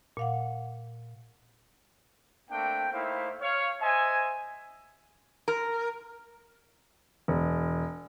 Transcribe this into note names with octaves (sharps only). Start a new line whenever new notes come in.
A#2 F5 F#5
A3 A#3 C4 D4 G5
A3 A#3 D#4 E4 C5 F5
C#5 F5
C5 D#5 E5 G#5
A#4
E1